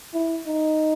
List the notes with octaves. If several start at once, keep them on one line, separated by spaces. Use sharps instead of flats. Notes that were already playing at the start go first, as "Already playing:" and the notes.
E4
D#4